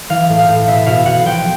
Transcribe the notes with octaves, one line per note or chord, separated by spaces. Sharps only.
E3 F5
A2
F5
A2
B2 E5
B2 F5
B2 F#5
F3 G5